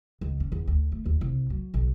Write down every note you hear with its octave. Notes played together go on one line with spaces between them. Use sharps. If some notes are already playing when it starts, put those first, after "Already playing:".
C#2
C#4
E2
D2
A3
D#2
C2
F#3
B1